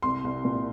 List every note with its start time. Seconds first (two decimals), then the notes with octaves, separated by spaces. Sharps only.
0.02 C2 C6
0.24 C2
0.45 A#2